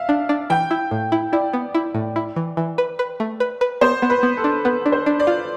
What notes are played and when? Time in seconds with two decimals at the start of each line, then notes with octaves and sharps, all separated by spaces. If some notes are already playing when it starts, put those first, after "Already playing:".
Already playing: E5 F5
0.09 D4
0.29 D4
0.50 E3 G5
0.71 E4
0.91 A2
1.12 E4
1.32 E4 D5
1.53 B3
1.75 E4
1.95 A2
2.16 E4
2.36 E3
2.57 E3
2.78 B4
2.99 B4
3.20 A3
3.40 B4
3.61 B4
3.81 B3 C5
4.02 B3
4.10 B4
4.23 B3
4.37 A4
4.44 D4
4.65 B3 B4
4.86 D4
4.92 C5
5.06 D4
5.20 D5
5.27 F4